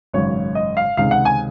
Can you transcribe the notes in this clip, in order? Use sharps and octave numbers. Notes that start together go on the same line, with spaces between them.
G#1 F#2 C#3 C#5
D#5
F5
C#2 C3 D#3 G#3 F5
F#5
G#5